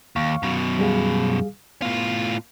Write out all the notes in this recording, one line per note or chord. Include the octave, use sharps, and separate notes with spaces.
D#2 F5 C#6
F#2 B2
G3 G#4 F5
A2 B3 F4